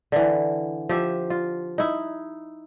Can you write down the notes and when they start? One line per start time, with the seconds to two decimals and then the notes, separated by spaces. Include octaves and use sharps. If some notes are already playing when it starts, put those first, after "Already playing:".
0.12 D3 E3
0.89 F3 G4 E5
1.30 F4
1.78 D#4 E4